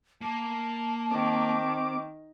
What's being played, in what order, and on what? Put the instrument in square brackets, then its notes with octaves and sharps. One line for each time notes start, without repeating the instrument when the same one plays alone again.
[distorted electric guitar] A#3 [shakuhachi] A5
[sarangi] D#3 [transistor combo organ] C4 D6